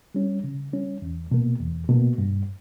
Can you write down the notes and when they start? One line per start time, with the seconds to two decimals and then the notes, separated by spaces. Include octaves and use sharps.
0.15 G3 C#4
0.44 C#3
0.73 G3 C#4
1.02 E2
1.31 B2 A#3
1.60 E2
1.89 B2 A#3
2.18 G2